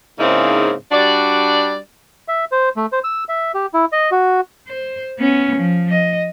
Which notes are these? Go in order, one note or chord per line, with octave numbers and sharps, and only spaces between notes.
G#2 C#3 A#3 C4 D#4 E4
G3 D4 F#4 D5
E5
C5
A3
C5
E6
E5
G4
E4
D#5
F#4
C5
B3 C#4
F3
D#5